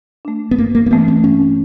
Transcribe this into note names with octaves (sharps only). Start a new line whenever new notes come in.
A3 D4
B3
G2 A#3
A#3
A#3
E3 A3 B3 C#4
C4
G2 C#4